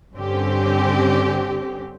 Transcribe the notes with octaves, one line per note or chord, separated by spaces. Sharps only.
G2 D3 C4 C#4 G4